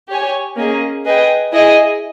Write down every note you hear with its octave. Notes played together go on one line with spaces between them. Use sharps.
G4 C#5 G#5
A#3 C#4 G#4 D#5
G#4 B4 D#5 G5
E4 G#4 D#5 G#5